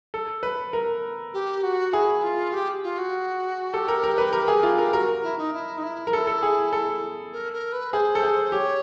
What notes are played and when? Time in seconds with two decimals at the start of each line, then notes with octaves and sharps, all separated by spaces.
0.14 A4
0.43 B4
0.73 A#4
1.33 G4
1.63 F#4
1.93 E4 G#4
2.23 F4
2.53 G4
2.84 F4
2.98 F#4
3.73 G4 A4
3.88 A#4
4.04 A#4
4.18 B4
4.33 A#4
4.48 G#4
4.63 F4
4.78 A#4
4.93 F#4 A#4
5.23 E4
5.38 D#4
5.53 E4
5.78 D#4
5.83 E4
6.07 A#4
6.13 E4 A4
6.27 A4
6.43 G#4
6.73 A4
7.33 A#4
7.53 A#4
7.73 B4
7.93 G#4 C5
8.15 A4
8.23 G#4
8.44 C5
8.52 G4 C#5